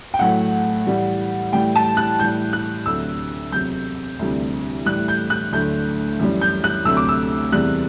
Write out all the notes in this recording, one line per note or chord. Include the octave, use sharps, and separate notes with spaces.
G5
A2 F#3 A3 F#5
A2 E3 G3
A2 E3 G3 G5
A5
F#6
A2 E3 G3 G6
F#6
D2 C3 F#3 A3 E6
E2 C3 F#3 G6
D2 C3 E3 G3
A2 E3 G3 F#6
G6
F#6
D2 D3 F#3 A3 G6
F#2 E3 G3
G6
F#6
D2 C3 F#3 A3 E6
D6
E6
E2 C3 E3 G3 F#6